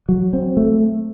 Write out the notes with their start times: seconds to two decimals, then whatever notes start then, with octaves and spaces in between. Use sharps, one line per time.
0.09 F#3
0.33 C4
0.57 A3